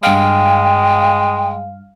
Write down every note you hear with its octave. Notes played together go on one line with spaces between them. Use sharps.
G2 G#3 F5 G5